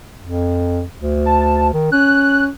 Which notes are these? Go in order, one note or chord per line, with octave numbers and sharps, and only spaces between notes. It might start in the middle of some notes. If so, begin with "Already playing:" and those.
F2
D2
A5
D#3
C#4 F#6